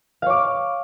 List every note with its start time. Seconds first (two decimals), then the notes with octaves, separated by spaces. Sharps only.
0.22 F5
0.26 C#5
0.30 D6